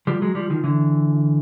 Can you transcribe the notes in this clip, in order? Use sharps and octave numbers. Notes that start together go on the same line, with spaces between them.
F3 G3
F#3 G#3
F3 G3
D#3 F3
D3 E3